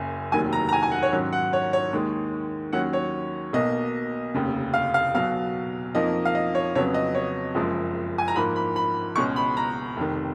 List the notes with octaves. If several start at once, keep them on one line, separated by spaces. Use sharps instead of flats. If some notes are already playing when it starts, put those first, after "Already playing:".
Already playing: F#1 F#2 C#3 G#5
F1 D#2 D#3 F#3 G#5
A#5
A#5
G#5
G#5
F#5
C#5
G#2 D#3 F#3 C#4
F#5
C#5
C#5
D#2 D#3 G#3
D#2 D#3 F#3 C#4 F#5
C#5
B1 B2 A#3 D#5
F1 D#2 C#3
F5
F5
B1 B2 F#3 F5
F2 F3 A#3 D#4 D#5
F5
D#5
C#5
F2 C#3 F#3 B3 C#5
D#5
C#5
F#1 F#2 F3 G#3
G#5
A#5
G#2 F3 A#3 B5
B5
B5
C#2 B2 G#3 C#4 C#6
B5
A#5
F1 F2 D#3